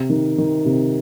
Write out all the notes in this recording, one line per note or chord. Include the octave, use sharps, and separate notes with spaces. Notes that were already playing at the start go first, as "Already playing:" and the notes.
Already playing: C3
D#3
D#3
C3